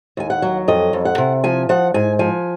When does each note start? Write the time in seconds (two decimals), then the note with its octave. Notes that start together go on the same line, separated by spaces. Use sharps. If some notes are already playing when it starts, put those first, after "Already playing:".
0.17 D#2 G#5
0.30 F#5
0.42 F#3
0.68 F2 D#5
0.93 F2
1.05 F#5
1.18 C3
1.44 F3 G#5
1.69 F3 F#5
1.94 G#2 G#5
2.19 F3 G#5